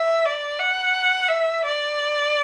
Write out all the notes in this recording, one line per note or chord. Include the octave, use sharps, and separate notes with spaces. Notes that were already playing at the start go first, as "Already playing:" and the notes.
Already playing: E5
D5
F#5
E5
D5